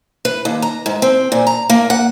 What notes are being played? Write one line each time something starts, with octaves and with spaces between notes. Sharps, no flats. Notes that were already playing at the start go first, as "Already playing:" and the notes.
B4
D#2
A#5
G#2
C4
A#2
A#5
A#3
F#5